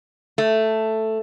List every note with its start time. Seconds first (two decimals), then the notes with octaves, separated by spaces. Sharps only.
0.38 A3